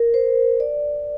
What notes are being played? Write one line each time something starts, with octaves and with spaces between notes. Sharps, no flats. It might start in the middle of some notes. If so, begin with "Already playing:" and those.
Already playing: A#4
C5
D5